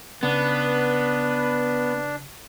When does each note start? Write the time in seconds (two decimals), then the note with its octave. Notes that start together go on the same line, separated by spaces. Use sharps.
0.23 C#3 B3 D4 B4